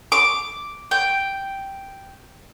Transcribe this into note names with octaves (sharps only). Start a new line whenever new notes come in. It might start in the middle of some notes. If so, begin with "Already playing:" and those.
D6
G5